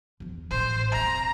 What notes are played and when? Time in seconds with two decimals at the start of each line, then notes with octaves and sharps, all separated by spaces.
0.20 E2 F3
0.51 A1 A2 C5
0.92 E1 C4 A#5